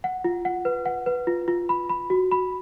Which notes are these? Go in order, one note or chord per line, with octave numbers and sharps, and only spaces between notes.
F#5
F4
F#5
B4
F#5
B4
F4
F4
B5
B5
F#4
B5